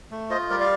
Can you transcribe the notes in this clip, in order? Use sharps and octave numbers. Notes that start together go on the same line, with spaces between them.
A3
F4 C5 D#5
G3 A#4 D5
D5 F5